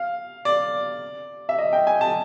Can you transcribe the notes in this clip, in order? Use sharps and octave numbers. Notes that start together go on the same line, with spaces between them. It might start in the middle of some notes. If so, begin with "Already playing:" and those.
Already playing: F5
D5
E5
D#5
G5
G#5
A5